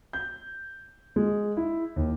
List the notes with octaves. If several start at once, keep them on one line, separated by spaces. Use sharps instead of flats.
G6
G#3
E4
D#2